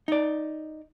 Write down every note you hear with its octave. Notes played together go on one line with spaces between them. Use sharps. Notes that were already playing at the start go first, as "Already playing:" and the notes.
D#4 D5